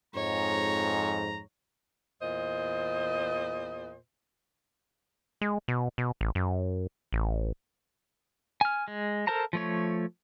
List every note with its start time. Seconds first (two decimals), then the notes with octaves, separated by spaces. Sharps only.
0.15 F2 G#2 C#5 A#5
2.21 E2 A#2 C5 D#5
5.41 G#3
5.68 B2
5.98 B2
6.21 A1
6.35 F#2
7.13 A1
8.61 G#5 F6
8.88 G#3
9.27 A4 A#4 C5 A5 A#5
9.53 F3 A3 C#5